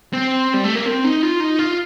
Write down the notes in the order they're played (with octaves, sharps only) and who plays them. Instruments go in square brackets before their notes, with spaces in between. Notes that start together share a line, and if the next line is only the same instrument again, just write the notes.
[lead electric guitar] C4
G3
A3
A#3
C4
D#4
F4
D#4
F4